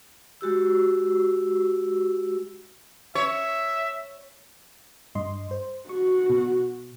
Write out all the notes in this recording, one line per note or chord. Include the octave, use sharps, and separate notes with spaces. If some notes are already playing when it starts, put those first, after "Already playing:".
G#3 F#4 G4 E6
C#5 E5
G2 D#5 C6
C5
F#4 C#6
B2